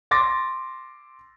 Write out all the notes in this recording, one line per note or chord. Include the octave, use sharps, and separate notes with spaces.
C6 D6 A6 A#6